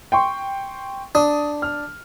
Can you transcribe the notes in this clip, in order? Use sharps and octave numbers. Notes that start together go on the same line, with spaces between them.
G5 C6 C#6
D4 D#6
F6